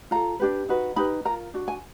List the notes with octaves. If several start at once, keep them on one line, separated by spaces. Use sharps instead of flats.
F4 A4 A#5
D4 G4 B4
D#4 F#4 B4
D#4 G4 B4 B5
F4 A#4 A#5
D4 F#4
G#5